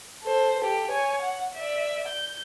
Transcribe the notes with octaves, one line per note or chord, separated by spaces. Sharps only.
A4 C5
G4 A4
C#5 G#5
F#5
D5 E5
G6